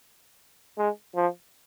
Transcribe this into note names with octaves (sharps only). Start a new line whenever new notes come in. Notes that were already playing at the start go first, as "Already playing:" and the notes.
G#3
F3